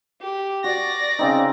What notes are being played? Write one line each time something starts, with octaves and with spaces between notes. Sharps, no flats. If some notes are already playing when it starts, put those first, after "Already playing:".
G4
F#4 D5 A#6
C#3 C4 D#4